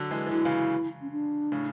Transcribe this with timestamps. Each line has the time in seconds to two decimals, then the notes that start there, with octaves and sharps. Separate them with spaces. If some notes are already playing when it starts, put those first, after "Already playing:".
Already playing: D3 F#3
0.11 E3 G#3
0.27 E3
0.31 D3 F#3 E4
0.45 C#3 E3
1.01 C#4
1.11 D4
1.52 A2 C#3